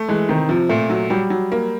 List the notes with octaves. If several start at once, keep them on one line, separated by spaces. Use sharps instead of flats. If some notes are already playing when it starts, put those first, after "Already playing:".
Already playing: A3
E3 G#3
C3 D#3
C3 F3
A#2 A3
F#3
F#3 G3
F#3
A#3